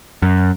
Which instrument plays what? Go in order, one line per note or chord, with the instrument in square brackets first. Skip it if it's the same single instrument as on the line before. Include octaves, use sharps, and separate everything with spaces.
[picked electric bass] F#2